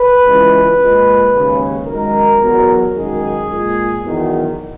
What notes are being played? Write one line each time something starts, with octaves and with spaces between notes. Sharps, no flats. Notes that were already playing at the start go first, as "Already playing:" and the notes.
Already playing: B4
C#2 C#3 E3 G#3
A#2 G#3
D#2 C#3 G#3
F#2 D#3 G#3 A#4
E2 B2 F#3
F#2 D#3 G#3 G#4
A#2 G#3
E2 D#3 F#3